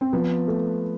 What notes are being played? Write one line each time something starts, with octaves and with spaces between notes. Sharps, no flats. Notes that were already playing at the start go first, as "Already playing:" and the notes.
C4
F3 B3
A3